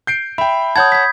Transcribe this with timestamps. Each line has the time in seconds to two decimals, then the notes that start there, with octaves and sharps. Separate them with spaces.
0.07 G6 C7 D7
0.38 E5 G5 B5
0.76 C#5 F#5 A5 D#6 G6 G#6
0.92 G#6 B6